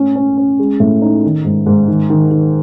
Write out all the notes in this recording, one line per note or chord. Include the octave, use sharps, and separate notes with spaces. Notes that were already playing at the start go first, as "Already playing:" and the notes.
Already playing: A2 C#4
C#4
C#4
G#3
A2
D#4
D#3
G#2
G#2
D#3
D#3
D#3